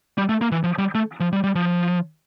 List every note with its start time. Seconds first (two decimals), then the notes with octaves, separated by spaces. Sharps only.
0.18 G3
0.29 A3
0.41 A#3
0.52 E3
0.63 F3
0.78 G3
0.95 A3
1.20 F3
1.33 G3
1.44 G3
1.55 F3